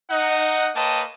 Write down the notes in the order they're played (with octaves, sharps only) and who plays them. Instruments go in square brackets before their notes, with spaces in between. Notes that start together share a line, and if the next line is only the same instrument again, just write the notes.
[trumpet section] D#4 D#5 F#5
A#3 B4 C#5 D#5 G5 A5